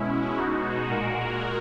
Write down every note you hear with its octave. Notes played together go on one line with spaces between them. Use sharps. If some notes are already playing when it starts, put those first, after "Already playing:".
Already playing: B2 G#3 C#4 E4
B2 G#3 D#4 F#4
A#2 G#3 F#4 A#4